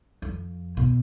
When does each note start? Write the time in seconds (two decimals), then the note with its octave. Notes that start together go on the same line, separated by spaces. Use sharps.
0.22 F2
0.77 B2